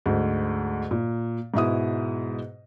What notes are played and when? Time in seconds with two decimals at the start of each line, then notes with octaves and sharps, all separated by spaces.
0.06 D2 G#2
0.91 A#2
1.54 G#2 B2 E4 D#6